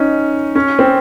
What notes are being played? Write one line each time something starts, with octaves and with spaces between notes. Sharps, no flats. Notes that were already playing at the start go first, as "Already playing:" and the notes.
Already playing: C#4 D#4
C#4
C4